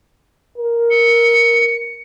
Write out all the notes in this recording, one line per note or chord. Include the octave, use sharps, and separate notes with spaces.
A#4
C#7